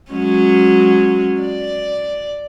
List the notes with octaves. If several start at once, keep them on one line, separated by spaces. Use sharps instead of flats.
F#3 G#3 C#4
D5